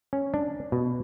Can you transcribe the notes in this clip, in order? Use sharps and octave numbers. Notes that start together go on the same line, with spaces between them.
C#4
D4
B2